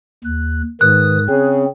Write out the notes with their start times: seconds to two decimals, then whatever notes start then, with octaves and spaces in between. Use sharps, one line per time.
0.24 D#2 F#6
0.81 G#2 D#3 B4 D#6 F#6
1.29 C#3 C4 G#4